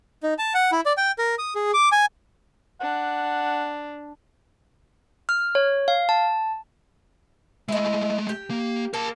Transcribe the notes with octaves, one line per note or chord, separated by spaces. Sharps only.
D#4
A5
F#5
E4
D5
G5
A#4
D#6
G#4
D6
G#5
D4 F#5
F6
C#5
F5
A5
G#3 A3 E4 D#5
G4
A#3
A#3 A#4 A5